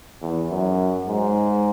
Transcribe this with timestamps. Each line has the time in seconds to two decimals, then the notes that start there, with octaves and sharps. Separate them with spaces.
0.22 E2
0.50 F#2
1.08 G#2